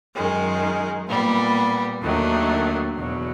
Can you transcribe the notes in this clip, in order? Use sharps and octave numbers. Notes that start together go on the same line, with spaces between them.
F#2 D#3 G#3
A#2 G3 B3
D#2 D#3 F#3 A3 D4
E2 B2 F#3